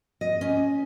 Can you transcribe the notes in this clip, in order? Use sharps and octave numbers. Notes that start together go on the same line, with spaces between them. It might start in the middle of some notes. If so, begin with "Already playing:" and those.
D#5
C#4